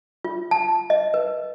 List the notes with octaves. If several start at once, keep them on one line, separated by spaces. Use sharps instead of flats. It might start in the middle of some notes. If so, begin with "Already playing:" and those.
F4
A5
D#5
B4